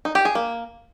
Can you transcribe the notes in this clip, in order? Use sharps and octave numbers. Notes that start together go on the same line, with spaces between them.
D#4
G4
G#4
A#3